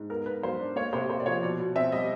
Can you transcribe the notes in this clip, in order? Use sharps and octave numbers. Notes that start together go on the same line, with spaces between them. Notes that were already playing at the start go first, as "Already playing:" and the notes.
Already playing: G#2
B3 A#4
B3 B4
F#3 C5
D4
A#3 C#5
C3 C5
C3 C5
D5
F3 C#5
B2 D5
B2
C4 E5
G3 D#5